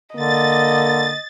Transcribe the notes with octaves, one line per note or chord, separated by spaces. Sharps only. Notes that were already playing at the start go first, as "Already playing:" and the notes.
D3 A#3 D#5 A6